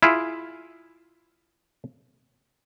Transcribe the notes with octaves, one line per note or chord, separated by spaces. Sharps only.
E4 F4 G#4